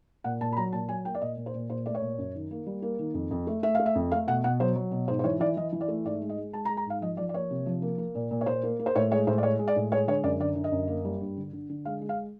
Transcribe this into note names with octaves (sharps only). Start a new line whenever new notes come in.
A#2 F#5
A#2 A5
B5
F#3 A#5
A#2 A5
F#3 G#5
A#3 G5
D5
A#2 D#5
A#2
C5
A#2
A#2 C5
A3 D5
C#5
A#2
F#2
D#3
A#3
G3
A#3
D#3
F2
F2
A3
A3 E5
A3 F5
E5
F2
A3 F5
B2 F#5
B2 F#5
F#3 C5
F#3
B2
G#2 C5
C5
E3 C#5
E3 D5
E3 D#5
E3
D5
A3
G#2 D5
G#3
D#5
G#3
G#3 A5
A#5
G#3
A#5
G#2 F5
F3 D#5
F3 D5
D5
A#3 C#5
C3
F3
A#3
A#3
A#2
A#2
C#5
A#2 C5
A#3
A#3
C5
A2 C#5
G#3 C#5
A2 C5
D5
G#3 C#5
G#3
D5
A2
G#3 C#5
D3 C#5
F#2 D5
D3 D5
D3
D#5
F#2
A#3
G3
G2
D3
D3
D3
G#3 F5
G#3
F5